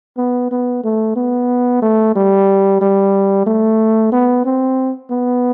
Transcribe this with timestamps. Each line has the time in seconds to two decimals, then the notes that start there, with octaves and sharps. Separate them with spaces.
0.17 B3
0.51 B3
0.84 A3
1.16 B3
1.82 A3
2.16 G3
2.81 G3
3.47 A3
4.12 B3
4.45 C4
5.11 B3